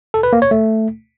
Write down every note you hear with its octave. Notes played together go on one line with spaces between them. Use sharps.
A4
B4
A#3
C#5
A3